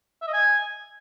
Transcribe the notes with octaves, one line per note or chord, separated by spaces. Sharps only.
E5
D#5
G#5